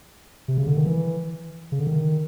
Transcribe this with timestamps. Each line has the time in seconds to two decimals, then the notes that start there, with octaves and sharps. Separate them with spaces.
0.48 C3
0.58 C#3
0.67 D3
0.77 D#3
0.86 E3
1.72 C#3
1.80 D3
1.87 D#3